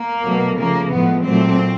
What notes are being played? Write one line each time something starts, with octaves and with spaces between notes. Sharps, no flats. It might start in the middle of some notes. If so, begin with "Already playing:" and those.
Already playing: A#3
B2 F#3 A3
C#3 F3 A3 A#3
A2 F3 G#3 B3
A#2 F#3 A3 C4